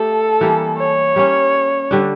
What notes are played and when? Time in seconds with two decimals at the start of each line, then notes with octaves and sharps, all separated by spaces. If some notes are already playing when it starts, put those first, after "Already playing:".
Already playing: A3 G4 A4
0.41 E3 G3 A#3
0.78 C#5
1.16 G3 A#3 C#4
1.91 D3 G3 D4